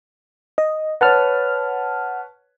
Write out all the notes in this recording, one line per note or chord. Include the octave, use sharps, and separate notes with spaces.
D#5
B4 C#5 F#5 A5 F6